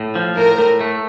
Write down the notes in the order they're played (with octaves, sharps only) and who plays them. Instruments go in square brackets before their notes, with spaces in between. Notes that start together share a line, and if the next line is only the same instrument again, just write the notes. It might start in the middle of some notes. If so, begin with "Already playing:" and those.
Already playing: [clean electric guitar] A2
F3
[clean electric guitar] A2 [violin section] A#4
[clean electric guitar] A2
A3